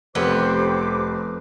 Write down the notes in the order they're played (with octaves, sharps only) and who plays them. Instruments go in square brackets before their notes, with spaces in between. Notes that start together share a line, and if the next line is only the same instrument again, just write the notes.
[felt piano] F1 [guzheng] F2 B3 [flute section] G4 C5 D6